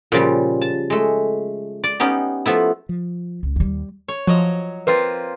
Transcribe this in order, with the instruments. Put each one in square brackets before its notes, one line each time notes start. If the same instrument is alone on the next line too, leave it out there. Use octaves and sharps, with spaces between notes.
[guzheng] A#2 C#3 F3 G3
A5
G#3 A3
D5
B3 C#4 D#4 G4
F3 A3 B3 E4
[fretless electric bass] F3
[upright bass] C#2
[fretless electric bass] D#2 [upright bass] F3 G3
[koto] C#5
[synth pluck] F3 [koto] F#3 D#5
[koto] A#3 C4 F4 [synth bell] B4